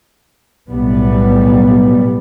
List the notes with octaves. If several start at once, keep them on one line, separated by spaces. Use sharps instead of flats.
B1 A2 G3 B3